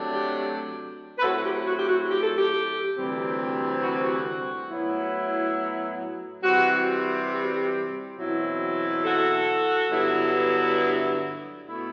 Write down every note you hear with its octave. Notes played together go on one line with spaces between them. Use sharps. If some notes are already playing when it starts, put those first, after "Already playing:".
Already playing: C3 F#3 A3 D4
G4
B4
A2 F#3 C4 E4 F#4 A4
G4
F#4
G4
F#4
G4
A4
G4
D2 C3 E3 G3 C4
F#4
F#4
A2 F#3 B3 E4
C3 E3 G3 C4 F#4
G4
F#4
G4
E2 B2 F#3 C4 E4
F#4 A4
G2 D3 F#3 B3 E4
B2 A3 E4